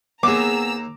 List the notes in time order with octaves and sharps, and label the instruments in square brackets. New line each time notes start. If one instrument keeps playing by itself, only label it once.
[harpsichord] D#2 [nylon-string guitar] B3 G#4 [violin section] A#5 E6 [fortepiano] D6